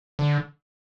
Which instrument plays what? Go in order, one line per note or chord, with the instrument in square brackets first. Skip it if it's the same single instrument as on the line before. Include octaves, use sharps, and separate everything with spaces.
[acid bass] D3